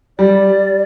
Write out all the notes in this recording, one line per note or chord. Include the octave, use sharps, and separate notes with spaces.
G3 D5